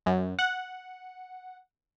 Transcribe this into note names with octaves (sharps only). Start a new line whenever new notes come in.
F#2
F#5